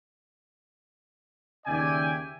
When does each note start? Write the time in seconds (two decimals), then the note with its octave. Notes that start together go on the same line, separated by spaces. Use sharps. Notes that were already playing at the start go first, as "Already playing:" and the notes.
1.66 D#2 C#3 D5 E5 G5 G#5